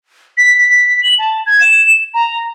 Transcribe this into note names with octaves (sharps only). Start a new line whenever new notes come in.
B6
B6
F#7
A5
G#6
E7
A#5